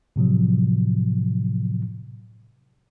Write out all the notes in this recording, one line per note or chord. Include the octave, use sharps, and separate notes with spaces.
A2 C3 F3 F#3